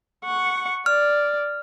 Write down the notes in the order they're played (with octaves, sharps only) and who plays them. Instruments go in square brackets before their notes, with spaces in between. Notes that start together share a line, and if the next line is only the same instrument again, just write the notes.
[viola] F#5 C#6
[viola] D5 [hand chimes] F6